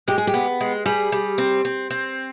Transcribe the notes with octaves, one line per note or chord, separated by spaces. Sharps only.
G#3 G4
G#4
G4
B3
G#3
G3 G#4
G3
C4
C4
C4